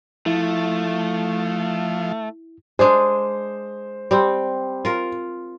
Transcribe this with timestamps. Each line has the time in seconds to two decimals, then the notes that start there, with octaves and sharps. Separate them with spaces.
0.26 F3 A3 E4
2.79 G#3 D4 G#4 C5
4.11 G3 C4
4.85 F4 A#4